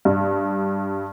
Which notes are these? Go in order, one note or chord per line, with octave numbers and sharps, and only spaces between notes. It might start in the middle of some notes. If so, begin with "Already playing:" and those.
G2